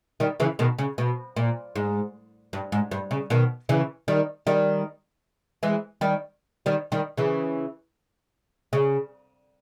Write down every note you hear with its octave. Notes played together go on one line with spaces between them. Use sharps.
D#3 G3
C#3 E3
B2 D#3
C#3
B2
A#2
G#2
G2
G#2
G2
C#3
B2 D#3
C#3 E3
D#3 G3
D#3 G3
E3 G#3
D#3 G3
D#3 G3
D#3 G3
C#3 E3
C#3